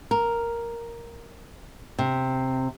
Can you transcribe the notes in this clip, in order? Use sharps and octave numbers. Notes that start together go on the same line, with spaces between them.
A#4
C3